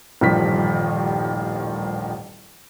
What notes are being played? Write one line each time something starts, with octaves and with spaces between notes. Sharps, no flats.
D#1 A1 G2 D#3 F3 B6